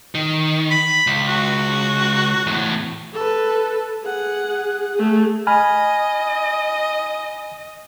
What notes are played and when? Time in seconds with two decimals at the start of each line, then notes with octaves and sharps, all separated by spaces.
0.15 D#3
0.71 B5
1.07 C#2
1.28 F#4
2.47 E2 A2
3.14 A4 B4
4.03 G#4 F#5
4.95 A3 G#4
5.47 D#5 G#5 B5 F6